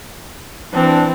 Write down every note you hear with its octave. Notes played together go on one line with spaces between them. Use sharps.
E3 C4 D4